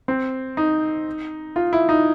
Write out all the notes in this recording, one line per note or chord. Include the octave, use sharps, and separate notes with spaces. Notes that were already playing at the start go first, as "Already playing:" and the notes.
C4
D#4
F4
E4
D#4